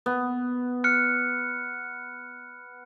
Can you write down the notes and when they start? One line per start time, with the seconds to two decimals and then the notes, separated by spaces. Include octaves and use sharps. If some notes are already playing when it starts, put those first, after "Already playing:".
0.06 B3
0.84 F6 F#6 C#7